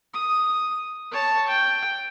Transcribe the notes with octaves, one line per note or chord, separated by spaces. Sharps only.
D#6
C#5 A5
G5